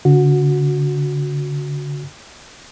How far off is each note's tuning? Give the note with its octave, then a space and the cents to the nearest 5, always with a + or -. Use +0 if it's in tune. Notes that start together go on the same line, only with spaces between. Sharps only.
D3 -40 F#4 -20